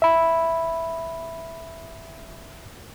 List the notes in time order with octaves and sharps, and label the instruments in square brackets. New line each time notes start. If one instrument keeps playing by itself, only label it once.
[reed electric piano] E5 B5